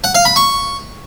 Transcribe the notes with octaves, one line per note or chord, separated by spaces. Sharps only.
F#5
F5
B5
C#6